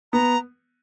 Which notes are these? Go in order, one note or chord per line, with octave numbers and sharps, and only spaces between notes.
B3 A#5